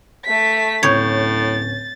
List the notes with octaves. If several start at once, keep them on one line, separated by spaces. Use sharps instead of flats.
A3 B6
D1 A2 C#4 C#5 G6 A6